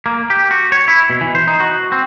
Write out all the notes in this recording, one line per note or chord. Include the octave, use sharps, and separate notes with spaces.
A#3
G4
F#4
C#5
E4
B2
E3
C5
D#4
F#4
C4